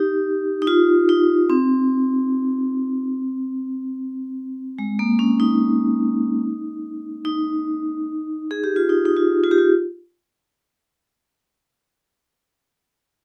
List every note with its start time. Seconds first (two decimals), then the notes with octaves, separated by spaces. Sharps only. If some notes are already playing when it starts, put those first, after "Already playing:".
Already playing: D#4 G4
0.62 D#4
0.67 F4
1.09 D#4
1.50 C4
4.79 G#3
4.99 A#3
5.19 C#4
5.40 D#4
7.25 D#4
8.51 G#4
8.64 G4
8.76 F4
8.89 D#4
9.06 D#4
9.17 F4
9.44 F4
9.51 G4
9.58 F4